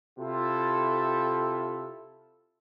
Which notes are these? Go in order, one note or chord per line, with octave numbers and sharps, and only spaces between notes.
C3 E4 F4 A4